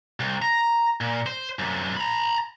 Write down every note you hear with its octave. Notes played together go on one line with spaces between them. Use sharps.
C2
A#5
A#2
C5
F#2 C3
A#5 B5